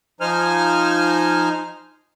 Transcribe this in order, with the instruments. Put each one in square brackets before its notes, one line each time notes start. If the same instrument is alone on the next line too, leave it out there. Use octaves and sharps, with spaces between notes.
[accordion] F3 D#4 C5 G#5 F6